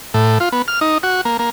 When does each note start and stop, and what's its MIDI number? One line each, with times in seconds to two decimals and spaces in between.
0.14 0.38 45
0.40 0.49 65
0.52 0.62 59
0.68 0.80 89
0.81 0.98 63
1.03 1.21 66
1.25 1.37 58
1.39 1.50 58